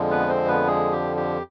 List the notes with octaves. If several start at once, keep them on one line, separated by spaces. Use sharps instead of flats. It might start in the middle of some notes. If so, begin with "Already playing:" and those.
Already playing: F2 D3 F3 G#3
B3 B4
C4 C5
B3 B4
G#3 G#4
G4
G4